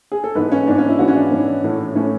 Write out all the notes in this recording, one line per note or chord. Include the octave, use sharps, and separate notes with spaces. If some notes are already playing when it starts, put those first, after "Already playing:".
G#4
A4
G#2 E3 B3 B4
C#4
G#2 E3 B3 D4
C#4
E4
G#2 E3 B3 F#4
C#4
D4
G#2 E3 B3
A2 E3 A3
A2 E3 A3 C#4